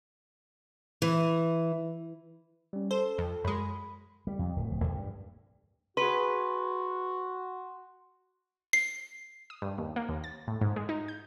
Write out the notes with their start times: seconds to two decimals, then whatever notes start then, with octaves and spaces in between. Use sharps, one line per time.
1.02 E3
2.73 G3 C#4
2.91 A4 C5
3.18 F2
3.45 F#2 G#3 B5
4.27 G3
4.39 F2
4.56 D1
4.70 D1
4.84 C#2
4.96 G2
5.97 F#4 G#4 B4 C6
8.73 C7
9.50 D#6
9.62 G2
9.78 D#2
9.96 A#3
10.09 D#2
10.24 A6
10.48 A2
10.61 G#2
10.76 G#3
10.89 D#4
11.08 G6